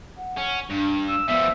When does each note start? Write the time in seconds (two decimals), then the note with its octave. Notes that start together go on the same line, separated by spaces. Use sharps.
0.17 F#5
0.37 C#4
0.70 G2 D4
1.08 E6
1.28 F3 G3 B3 E5